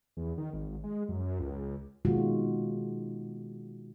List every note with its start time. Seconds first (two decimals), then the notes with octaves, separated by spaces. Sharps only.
0.17 E2
0.38 D#3
0.53 G#1
0.84 G#3
1.09 F#2
1.39 C#2
2.05 B2 D#3 G#3 A#3 F4 F#4